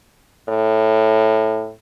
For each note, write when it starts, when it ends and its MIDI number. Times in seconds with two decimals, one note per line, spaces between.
0.49 1.71 45